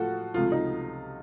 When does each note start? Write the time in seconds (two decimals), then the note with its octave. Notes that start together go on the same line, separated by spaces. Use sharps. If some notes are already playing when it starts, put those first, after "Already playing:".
Already playing: A2 F3 A3 F4 F#4 A4
0.34 C#2 C3 F3 A3 F4
0.52 D#4